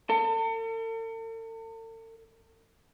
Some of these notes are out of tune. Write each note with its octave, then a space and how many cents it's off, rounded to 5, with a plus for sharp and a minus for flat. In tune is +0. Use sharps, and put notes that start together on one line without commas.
A4 +45